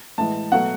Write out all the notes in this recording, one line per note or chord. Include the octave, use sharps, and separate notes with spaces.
A2 E3 G#3 A5
B2 F#3 A3 F#5